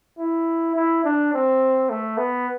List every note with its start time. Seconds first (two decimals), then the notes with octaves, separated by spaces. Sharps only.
0.19 E4
0.76 E4
1.04 D4
1.33 C4
1.90 A3
2.17 B3